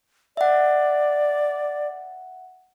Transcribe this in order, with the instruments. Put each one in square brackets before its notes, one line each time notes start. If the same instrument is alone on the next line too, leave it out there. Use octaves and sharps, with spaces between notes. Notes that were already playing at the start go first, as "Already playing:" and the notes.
[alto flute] D5 [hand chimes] E5 F#5